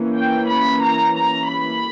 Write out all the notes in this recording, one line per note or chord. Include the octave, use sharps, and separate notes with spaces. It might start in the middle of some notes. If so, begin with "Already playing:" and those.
Already playing: E3 A#3 C#4
G5
B5
A#5
A#5
B5